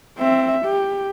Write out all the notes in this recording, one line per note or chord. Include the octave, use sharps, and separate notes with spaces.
C4 E5
G4